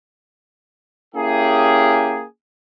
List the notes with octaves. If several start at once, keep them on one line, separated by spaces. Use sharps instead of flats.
A#3 C#4 E4 G4 G#4